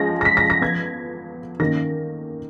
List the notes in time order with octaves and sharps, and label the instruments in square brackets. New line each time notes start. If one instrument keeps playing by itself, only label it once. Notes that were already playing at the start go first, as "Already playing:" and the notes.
Already playing: [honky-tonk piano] F3 G#3 C#4 A#6
A#6
B6
A#6
A#6
F3 B3 G#6
D#3 A#3 C#4 A#6